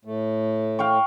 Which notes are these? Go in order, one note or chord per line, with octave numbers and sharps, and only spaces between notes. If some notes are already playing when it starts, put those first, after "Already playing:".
A2 A3
F5 G5 C#6